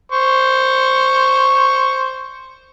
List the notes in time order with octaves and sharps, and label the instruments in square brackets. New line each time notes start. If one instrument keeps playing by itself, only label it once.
[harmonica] C5 C#6